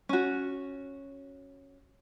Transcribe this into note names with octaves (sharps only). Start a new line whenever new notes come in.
C#4 F#4